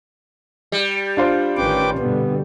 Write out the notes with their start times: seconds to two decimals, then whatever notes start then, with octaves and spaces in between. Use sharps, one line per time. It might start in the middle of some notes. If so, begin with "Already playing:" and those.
0.72 G3
1.17 D4 F4 C5
1.57 A1 D#3 C#4 B4 G5 D6
1.98 G2 B2 D3 B3